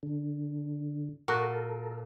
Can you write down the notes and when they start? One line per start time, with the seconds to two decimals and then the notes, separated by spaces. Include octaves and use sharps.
0.03 D3
1.28 A#2 F#4 A4 A#4